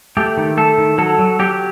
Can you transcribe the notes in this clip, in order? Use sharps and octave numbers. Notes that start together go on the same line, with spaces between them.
A3 G4
D#3
A3 A4
D#3
F#3 A4
F#3
F#3 G4